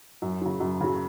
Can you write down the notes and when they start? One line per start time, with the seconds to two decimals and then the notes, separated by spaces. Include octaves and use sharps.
0.22 F#2
0.41 C#3 F#3
0.60 F#2
0.80 C#3 F#3